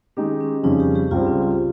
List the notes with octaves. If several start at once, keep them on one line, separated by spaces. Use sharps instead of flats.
D#3 G#3 C#4 D#4 G4
C#4
F2 C#3 G3 C#4 D#4
G4
G4
C#2 C#3 G3 C4 F4
C#4
F4